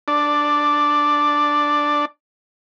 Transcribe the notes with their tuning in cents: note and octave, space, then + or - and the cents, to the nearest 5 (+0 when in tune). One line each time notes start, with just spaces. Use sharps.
D4 +0 D5 +0